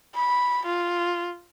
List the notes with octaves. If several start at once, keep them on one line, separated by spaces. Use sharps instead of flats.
B5
F4